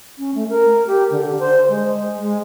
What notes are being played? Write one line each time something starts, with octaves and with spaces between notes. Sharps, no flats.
C#4
A3
A#4
G4
D3
C5
G#3
G#3